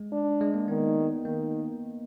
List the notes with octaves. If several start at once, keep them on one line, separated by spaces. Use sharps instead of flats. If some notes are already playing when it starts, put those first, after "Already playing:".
Already playing: G#3
D4
G#3
A#3
D#3 B3
D#3 A#3